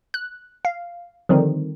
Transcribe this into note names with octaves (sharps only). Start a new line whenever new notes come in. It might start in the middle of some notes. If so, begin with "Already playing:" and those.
F#6
F5
D3 D#3 F3 G3 C4 D#4